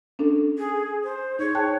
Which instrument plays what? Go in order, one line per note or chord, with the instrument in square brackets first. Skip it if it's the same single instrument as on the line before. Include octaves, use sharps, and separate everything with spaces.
[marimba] C#4 D4 A4
[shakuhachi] G#4
C5
[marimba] D#4 G#4 [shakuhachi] C#5
[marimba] G5 A5 F#6